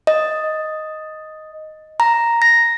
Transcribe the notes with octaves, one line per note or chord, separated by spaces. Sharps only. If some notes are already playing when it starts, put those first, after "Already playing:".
D#5
A#5
A#6